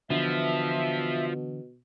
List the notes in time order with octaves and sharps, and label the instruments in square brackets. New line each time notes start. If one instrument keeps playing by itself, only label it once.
[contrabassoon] B2 [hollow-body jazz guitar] D3 E3 [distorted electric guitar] F3 [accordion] E5